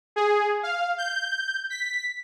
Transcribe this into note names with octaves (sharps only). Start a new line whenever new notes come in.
G#4
F5
G6
B6